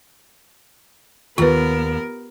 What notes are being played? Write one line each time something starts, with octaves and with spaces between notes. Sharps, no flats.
D#2 B3 F4 A#4 B4